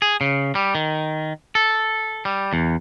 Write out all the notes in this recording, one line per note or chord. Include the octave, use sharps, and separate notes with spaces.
G#4
C#3
G3
D#3
A4
G3
E2